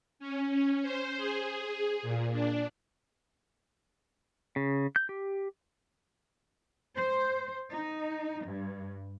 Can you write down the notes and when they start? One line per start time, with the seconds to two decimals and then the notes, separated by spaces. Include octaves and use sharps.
0.19 C#4
0.50 C#4
0.82 C5
1.17 G#4
2.02 A#2
2.32 D4
4.56 C#3
4.96 G6
5.09 G4
6.97 C5
7.73 D#4
8.45 G2